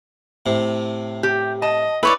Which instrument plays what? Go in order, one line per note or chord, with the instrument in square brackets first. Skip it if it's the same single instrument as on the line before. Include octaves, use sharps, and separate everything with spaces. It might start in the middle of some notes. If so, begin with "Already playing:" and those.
[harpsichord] A2 C3
[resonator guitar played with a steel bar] G4
[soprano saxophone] D#5 [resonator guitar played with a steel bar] A5
[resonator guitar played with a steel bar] E4 [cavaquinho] B4 C#5 D5